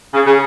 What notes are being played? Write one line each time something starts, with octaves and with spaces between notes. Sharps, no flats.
C#3
C#3